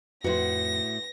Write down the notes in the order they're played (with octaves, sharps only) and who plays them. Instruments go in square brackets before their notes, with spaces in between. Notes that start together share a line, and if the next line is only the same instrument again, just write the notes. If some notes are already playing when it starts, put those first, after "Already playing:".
[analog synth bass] F2 [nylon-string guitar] A2 F#4 [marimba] B4 F#5 C6 [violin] A#6